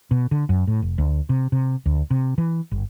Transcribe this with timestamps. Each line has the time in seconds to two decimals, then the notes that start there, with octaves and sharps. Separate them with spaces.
0.11 B2
0.31 D3
0.49 F#2
0.67 A2
0.82 F1
0.98 D2
1.29 C3
1.52 C3
1.86 D2
2.11 C3
2.38 E3
2.71 G1